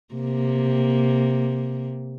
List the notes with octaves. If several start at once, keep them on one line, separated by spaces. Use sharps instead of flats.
C3 A#3